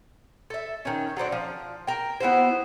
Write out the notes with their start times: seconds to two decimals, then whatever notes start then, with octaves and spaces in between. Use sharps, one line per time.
0.50 A4 E5
0.85 D#3 C#4
1.17 F#3 A3 C4 D4
1.32 F3
1.87 A#4 G5
2.20 B3 E4 F#4 C5